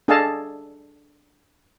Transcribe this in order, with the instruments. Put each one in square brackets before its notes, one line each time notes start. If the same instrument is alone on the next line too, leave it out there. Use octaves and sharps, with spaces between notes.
[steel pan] D4 G#4 A4 D#5 F5 A5